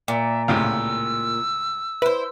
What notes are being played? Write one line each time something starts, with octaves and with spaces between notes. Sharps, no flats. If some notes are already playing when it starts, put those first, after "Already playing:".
A#2 E5
C#2 A2 C3 F5 E6
E4 B4 C5